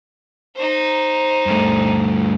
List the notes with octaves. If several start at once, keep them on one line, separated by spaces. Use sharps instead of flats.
D#4 C5
G2 A3